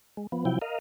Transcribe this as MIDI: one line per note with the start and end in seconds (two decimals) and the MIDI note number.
0.17 0.27 56
0.32 0.45 53
0.32 0.45 59
0.45 0.59 48
0.45 0.59 53
0.45 0.59 54
0.45 0.59 64
0.45 0.59 79
0.62 0.79 70
0.62 0.79 75
0.62 0.79 77